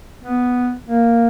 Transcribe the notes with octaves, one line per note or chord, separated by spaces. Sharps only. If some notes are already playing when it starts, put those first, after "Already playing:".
B3
A#3